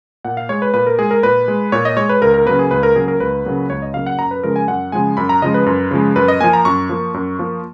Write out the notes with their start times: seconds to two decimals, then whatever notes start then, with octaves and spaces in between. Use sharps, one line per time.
0.25 A#2 F#5
0.37 F5
0.49 G#3 C#5
0.62 B4
0.74 A#2 B4
0.86 A#4
0.99 G#3 G#4
1.11 A#4
1.23 A#2 B4
1.48 G#3
1.72 A#2 C#5
1.85 D#5
1.97 G#3 C#5
2.09 B4
2.22 C#2 A#4
2.34 A#4
2.46 C#3 F#3 A#3 B4
2.59 G#4
2.71 C#2 B4
2.83 A#4
2.95 C#3 F#3 A#3 G#4
3.08 A#4
3.20 C#2 B4
3.45 C#3 F#3 A#3
3.70 C#2 C#5
3.82 D#5
3.94 C#3 F#3 A#3 F5
4.06 F#5
4.19 F#2 A#5
4.31 B4
4.43 C#3 F3 G#3 A#4
4.56 G#5
4.68 F#2 F#5
4.92 C#3 F3 G#3 G#5
5.17 F#2 B5
5.29 A#5
5.42 C#3 F3 G#3 D#5
5.54 B4
5.66 F#2
5.91 C#3 F3 G#3
6.16 F#2 B4
6.28 D#5
6.40 F3 A#3 G#5
6.53 A#5
6.65 F#2 C#6
6.89 F3 A#3
7.14 F#2
7.39 F3 A#3